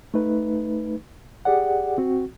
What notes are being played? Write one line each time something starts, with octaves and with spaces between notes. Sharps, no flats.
A3 D#4 B4
G4 G#4 D5 F#5
C4 F#4